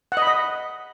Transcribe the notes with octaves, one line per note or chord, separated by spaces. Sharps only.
F#5
D#5
B5
D#5